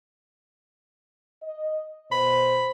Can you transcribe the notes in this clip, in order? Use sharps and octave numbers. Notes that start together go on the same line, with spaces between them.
D#5
B2 C5 B5